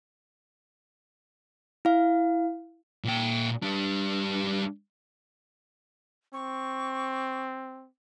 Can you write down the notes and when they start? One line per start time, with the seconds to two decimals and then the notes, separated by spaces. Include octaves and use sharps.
1.85 E4 F5
3.04 A#2 G5
3.62 G3 D4
6.33 C4 C#6